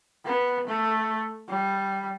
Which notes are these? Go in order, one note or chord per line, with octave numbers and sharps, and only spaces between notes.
B3
A3
G3